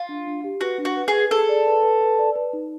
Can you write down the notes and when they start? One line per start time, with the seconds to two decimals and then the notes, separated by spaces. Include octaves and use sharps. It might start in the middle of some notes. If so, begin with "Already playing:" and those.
Already playing: F4
0.09 D4
0.27 D4
0.44 G4
0.61 F#4 B4
0.78 D4
0.85 F#4
0.97 B4
1.08 G#4
1.14 B4
1.31 G#4 A4
1.49 D5
1.67 B4
1.83 B4
2.01 B4
2.19 D5
2.36 B4
2.53 D#4